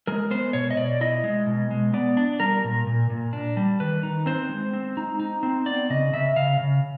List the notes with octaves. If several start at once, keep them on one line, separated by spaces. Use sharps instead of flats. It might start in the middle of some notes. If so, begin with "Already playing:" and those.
G#3 A#4
B3 C5
B2 C#5
D#5
B2 D5
E4 D#5
G#3
B2
G#3
B3 D5
D4
G3 A#4
A#2
A#2
A#2
D4
G3
D#3 B4
D#4
C4 C5
G#3
C4
D#4
D#4
C4
B3 D5
C#3 D#5
C#3 E5
C#3 F5
C#3